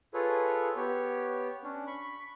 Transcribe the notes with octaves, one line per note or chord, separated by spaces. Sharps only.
F4 G#4 A4 B4 C#5
B3 G4 C#5
C#4 D4
B5 C#6